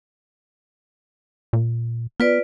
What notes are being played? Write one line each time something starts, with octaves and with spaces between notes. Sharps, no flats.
A#2
B3 F4 B4 D5